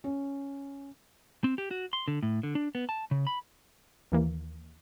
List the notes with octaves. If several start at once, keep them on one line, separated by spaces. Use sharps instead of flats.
C#4
C4
G4
F#4
C6
D3
A2
D3
D4
B3
A5
C#3
B5
D#2 E3 A#3